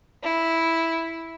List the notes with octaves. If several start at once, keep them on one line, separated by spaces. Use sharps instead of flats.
E4